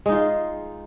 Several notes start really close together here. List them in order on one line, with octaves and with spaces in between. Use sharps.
G#3 D#4 F4